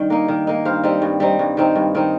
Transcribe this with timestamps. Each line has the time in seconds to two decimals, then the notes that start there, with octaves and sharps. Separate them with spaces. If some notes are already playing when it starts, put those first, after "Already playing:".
Already playing: G2 D#3 G3
0.10 A#3 D#4
0.28 D#3
0.47 A#3 D#4
0.65 G2 C5 F5
0.83 G3 C4 D#4
1.02 G2
1.20 G3 C4 D#4
1.39 G2
1.57 D#3 C4 D#4
1.76 G2
1.95 D#3 C4 D#4